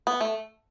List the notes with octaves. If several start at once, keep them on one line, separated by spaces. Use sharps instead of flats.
B3
A3